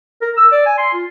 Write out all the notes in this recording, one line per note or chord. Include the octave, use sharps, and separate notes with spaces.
A#4
E6
D5
G#5
C6
F4